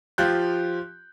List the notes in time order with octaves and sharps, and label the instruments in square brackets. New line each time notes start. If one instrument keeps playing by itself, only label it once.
[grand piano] F3 F4 G4 F#6 G6